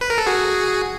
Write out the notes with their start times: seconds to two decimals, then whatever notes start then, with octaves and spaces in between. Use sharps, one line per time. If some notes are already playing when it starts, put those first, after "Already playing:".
0.01 B4
0.10 A#4
0.18 A4
0.26 F#4 G#4